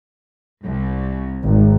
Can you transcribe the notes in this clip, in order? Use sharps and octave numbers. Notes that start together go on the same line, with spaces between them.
C2
G#1